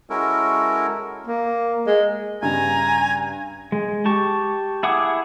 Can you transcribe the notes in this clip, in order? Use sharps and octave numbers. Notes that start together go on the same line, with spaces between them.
G#3 C#4 E4 F#4 A4 A#4
A#3
G#3
G2 C#3 G#5 A#5
G#3
G4 A5 C#6
E4 G#4 F#5 D6 D#6